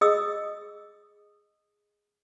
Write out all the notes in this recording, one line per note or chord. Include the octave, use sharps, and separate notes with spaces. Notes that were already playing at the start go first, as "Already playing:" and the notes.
G#4 D#5 D#6 E6